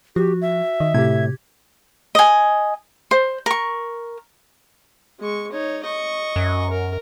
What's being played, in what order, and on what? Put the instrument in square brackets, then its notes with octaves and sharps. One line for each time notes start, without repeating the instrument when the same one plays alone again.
[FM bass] F3 [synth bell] F#4 [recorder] G4
[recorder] E5
[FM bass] D#3 [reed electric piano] D#5
[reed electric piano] A2 [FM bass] C3 [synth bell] G4 G#6
[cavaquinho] D#5 G#5
C5
A#4 C#6
[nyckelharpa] G#3 C#6
D#4 C#5
D#5 C#6
[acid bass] F#2
[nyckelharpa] A#4